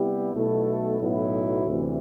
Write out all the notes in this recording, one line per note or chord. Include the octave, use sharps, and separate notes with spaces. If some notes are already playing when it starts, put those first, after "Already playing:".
Already playing: C3 G3 B3 E4 G4
B1 B2 A3 E4 A4
B1 A2 F#3 B3 E4
D2 C3 E3